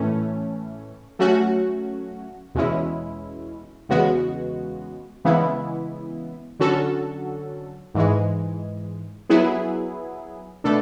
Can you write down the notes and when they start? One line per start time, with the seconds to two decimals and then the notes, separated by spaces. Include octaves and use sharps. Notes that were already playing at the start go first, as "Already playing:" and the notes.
Already playing: A2 E3 A3 C#4
1.19 F#3 A3 C#4 F#4
2.55 E2 B2 G#3 C#4 E4
3.89 E2 C#3 G#3 B3 F#4
5.25 C#3 E3 G#3 B3 E4
6.59 D3 F#3 C#4 F#4 A4
7.94 G#2 E3 G#3
9.29 F#3 B3 E4 G#4
10.64 B2 A3 D4 A4